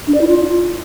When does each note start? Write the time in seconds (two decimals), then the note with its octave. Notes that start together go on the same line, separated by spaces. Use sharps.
0.07 D4
0.14 D5
0.21 E4
0.28 F4